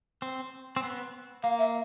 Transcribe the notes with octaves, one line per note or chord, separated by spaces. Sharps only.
C4
C4
B3
A#3 F5
E5